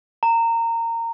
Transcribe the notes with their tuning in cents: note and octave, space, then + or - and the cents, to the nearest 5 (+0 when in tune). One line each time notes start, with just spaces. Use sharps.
A#5 -20